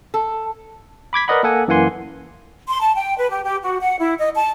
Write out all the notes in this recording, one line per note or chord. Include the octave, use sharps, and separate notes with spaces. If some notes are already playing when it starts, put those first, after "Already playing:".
A4
B5 D6 G#6 B6
A#4 B4 D5 D#5 F#5 B5
A#3 A4 F#5 G#5
F#2 E3 A#3 F#5 G#5 C6
C6
A5
G5
B4
G4
G4
F#4
F#5
E4
D#5
A5